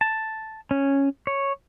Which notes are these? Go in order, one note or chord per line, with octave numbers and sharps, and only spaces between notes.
A5
C#4
C#5